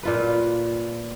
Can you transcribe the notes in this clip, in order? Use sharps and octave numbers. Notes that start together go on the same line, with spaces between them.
A#2 F4 B4